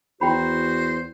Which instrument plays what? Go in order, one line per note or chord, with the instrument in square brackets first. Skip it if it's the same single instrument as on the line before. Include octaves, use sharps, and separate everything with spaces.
[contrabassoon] E2 [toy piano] E4 G5 B5 [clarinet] F#4 [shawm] C5